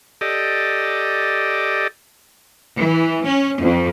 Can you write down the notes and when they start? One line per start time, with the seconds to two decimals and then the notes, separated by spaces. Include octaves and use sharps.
0.21 G4 A4 D5 D#5
2.78 E3
3.24 C#4
3.59 F2